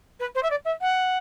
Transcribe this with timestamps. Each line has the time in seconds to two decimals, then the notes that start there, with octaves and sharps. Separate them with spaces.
0.19 B4
0.35 C5
0.42 E5
0.50 D5
0.65 E5
0.81 F#5